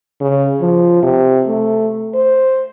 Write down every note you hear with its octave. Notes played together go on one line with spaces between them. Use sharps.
C#3
F3
C3
A3
C5